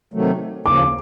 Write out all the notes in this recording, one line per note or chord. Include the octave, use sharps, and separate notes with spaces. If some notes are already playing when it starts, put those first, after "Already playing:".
C3 D#3 F#3 A3
D#2 C#3 F3 A#3 D6